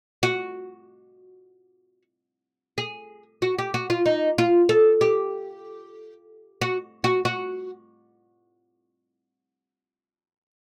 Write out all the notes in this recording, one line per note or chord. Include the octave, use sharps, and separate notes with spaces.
F#4
G#4
F#4
G4
F#4
F4
D#4
F4
A4
G4
F#4
F#4
F#4